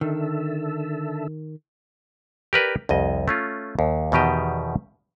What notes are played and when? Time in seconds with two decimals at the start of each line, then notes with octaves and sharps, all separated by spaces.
0.01 D3 D#3 A4 E5
2.53 G4 A#4 B4 D5
2.89 C2 F2 D#5
3.28 A3 C#4 F4
3.79 D#2
4.12 E2 B2 D#3 G4 D#5